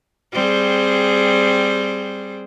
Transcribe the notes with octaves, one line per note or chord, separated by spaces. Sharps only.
G3 C4 G#4